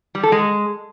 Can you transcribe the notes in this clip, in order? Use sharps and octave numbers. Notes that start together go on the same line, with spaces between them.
G3
A4
G#3